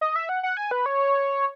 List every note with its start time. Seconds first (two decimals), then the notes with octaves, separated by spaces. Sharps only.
0.01 D#5
0.16 E5
0.29 F#5
0.43 F#5
0.57 G#5
0.71 B4
0.86 C#5